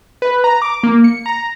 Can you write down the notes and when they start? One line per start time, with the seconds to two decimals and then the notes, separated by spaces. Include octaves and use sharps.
0.22 B4
0.44 A#5
0.62 D6
0.83 A#3
1.04 C#7
1.26 A#5